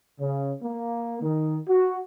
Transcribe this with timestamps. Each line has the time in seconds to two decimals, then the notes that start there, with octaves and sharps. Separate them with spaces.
0.20 C#3
0.63 A#3
1.23 D#3
1.69 F#4